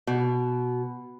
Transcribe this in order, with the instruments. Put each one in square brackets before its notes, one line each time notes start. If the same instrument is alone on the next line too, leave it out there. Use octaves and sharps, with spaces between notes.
[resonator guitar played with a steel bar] B2